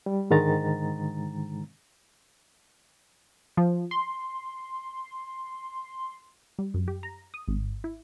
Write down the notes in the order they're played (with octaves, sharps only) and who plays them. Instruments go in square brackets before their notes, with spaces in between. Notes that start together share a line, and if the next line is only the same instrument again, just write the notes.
[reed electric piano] G3
G#2 D3 D#3 G#3 A#5 A6
[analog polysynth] F3
C6
[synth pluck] G3
F#2
G4
A#5
D#6
G#1
E4